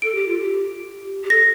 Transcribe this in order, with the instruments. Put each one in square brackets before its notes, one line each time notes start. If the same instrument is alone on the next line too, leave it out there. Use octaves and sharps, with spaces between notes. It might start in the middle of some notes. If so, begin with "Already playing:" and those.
[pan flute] A4 [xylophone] D7
[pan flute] G4
F4
G4
G4
[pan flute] A4 [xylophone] A#6